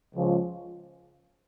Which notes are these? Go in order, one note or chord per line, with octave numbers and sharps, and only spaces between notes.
C#2 C#3 F3